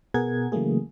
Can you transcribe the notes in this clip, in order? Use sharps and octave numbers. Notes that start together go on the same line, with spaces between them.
B2 B3 G#4 A#4 F#5 G#6
C#3 E3 F#3 A3 A#3 G#4